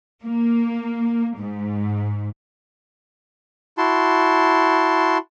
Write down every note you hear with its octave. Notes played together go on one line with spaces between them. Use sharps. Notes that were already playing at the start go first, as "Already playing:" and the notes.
A#3
G#2
E4 F#4 A5 C6